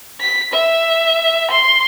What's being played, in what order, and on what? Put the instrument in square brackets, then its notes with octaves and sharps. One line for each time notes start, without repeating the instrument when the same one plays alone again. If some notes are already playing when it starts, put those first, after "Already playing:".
[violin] B6
E5
C6